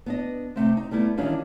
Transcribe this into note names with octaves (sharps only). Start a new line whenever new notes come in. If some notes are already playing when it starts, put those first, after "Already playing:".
B3 D4 D#5
C3 A3 C4
D#4
G3 A3 B3 E4
D#3 E3 G3 C#4 D4 F4